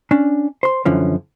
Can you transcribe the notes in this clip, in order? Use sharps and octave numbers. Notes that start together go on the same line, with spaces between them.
C#4 D4
C5 C6
F#2 D3 E3 F3 C#4